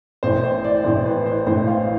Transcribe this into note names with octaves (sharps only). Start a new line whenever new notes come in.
A1 A2 E3 C5
C5
D5
A1 A2 E3 C5
B4
C5
A1 A2 E3 C5
F5